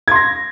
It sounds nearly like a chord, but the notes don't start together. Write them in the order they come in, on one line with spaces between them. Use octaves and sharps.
G#6 C6 A#6